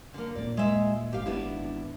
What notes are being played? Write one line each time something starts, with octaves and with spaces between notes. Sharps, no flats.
D3 A#3
D#1 A#2 A#3 D5
G#3 E5
G#1 G4 F5
B3 D4 E4